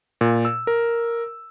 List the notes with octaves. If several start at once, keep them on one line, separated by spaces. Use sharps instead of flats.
A#2
E6
A#4